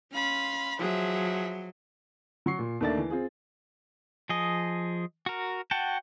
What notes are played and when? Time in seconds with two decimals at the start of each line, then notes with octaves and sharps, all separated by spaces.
0.13 C#4 F5 B5 C6
0.79 F3 F#3 G#4 E5
2.46 F#3 C#6 C7
2.59 A#2
2.80 D#2 A3 A#3 D4 E5 A6
2.98 E3
3.10 C4 F4 G#4
4.29 F3 G#4 D#5
5.26 F#4 A#4
5.71 F#4 F#5 G5 A5